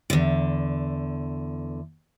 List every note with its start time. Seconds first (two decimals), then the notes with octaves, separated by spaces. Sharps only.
0.10 E2 D3